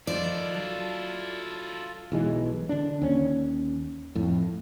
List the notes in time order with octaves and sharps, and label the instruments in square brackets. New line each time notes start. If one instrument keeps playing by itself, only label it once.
[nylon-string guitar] D#3 F3 [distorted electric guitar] D4 E4 [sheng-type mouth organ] F4 A4 [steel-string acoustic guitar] D5
[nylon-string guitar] F#3
[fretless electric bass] B1 E3 G#3
D3 D4
D#2 C#4
F2 A2